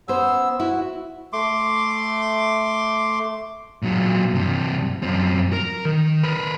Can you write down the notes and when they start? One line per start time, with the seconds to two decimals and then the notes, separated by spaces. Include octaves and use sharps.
0.08 B3 C#4 C5 E6
0.60 E4 F#4
1.33 A3 C6 D6
3.83 A#2 F#3
4.34 G2 C3
5.03 F#2 C4
5.53 A#4
5.85 D#3
6.23 A#4 B4